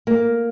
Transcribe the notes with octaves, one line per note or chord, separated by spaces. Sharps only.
A#3